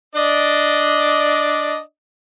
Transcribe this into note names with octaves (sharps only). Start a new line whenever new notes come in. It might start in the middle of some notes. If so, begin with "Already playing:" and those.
D4 D5 D#5